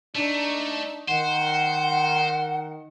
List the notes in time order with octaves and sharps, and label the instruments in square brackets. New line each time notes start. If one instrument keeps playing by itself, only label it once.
[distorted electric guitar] A3 [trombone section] D4 D#4
[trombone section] D#3 [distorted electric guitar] C5 [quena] F#5